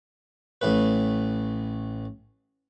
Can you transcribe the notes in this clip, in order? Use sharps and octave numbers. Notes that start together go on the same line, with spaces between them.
A1 A2 B4